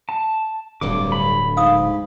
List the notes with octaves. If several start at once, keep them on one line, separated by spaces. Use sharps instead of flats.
A5
D1 D2 G2 D3 D6
B5
G#2 F5 D#6